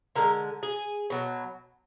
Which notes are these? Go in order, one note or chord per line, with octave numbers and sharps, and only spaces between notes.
D3 G#3 A#4
G#4
B2 F#3